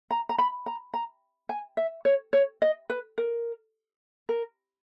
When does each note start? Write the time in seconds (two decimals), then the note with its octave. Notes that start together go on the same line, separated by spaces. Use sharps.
0.11 A#5
0.29 A#5
0.38 B5
0.66 A#5
0.94 A#5
1.49 G#5
1.77 E5
2.05 C#5
2.33 C#5
2.62 D#5
2.90 B4
3.18 A#4
4.29 A#4